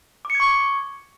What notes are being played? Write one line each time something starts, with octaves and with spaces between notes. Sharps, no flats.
D6
C#7
G#6
C#6